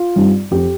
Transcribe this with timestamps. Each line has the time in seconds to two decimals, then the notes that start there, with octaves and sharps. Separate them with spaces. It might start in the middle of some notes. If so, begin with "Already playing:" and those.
Already playing: F4
0.16 G2 G3 C4 D#4
0.51 F2 F3 C4 G4